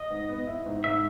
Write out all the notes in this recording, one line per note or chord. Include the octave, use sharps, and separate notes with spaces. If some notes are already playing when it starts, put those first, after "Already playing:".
Already playing: D#5
G#2
B3
E4
G#2
G#2 E5